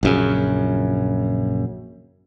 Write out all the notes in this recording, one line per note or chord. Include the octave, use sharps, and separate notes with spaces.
A#1 F#2 C#3